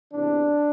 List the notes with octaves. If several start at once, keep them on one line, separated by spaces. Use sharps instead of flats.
E2 C3 E3 D4